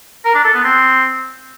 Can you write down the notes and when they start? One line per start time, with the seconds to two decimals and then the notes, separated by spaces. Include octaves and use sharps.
0.25 A#4
0.35 D4
0.44 A4
0.54 B3
0.64 C4